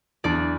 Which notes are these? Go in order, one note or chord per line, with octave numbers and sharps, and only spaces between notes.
E2 D4 D5